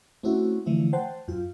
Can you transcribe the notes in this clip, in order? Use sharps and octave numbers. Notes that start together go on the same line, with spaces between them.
A3 C4 C#4 E4 F#4
D3 E3 F3 A3 E4
C5 F#5 G5 A5
F#2 F4